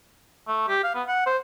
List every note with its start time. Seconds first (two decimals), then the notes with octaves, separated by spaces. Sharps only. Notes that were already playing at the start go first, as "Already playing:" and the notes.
0.48 A3
0.68 G4
0.83 F5
0.95 B3
1.08 F#5
1.26 C5